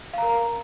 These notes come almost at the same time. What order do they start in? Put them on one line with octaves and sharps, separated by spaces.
F5 A#5 A#4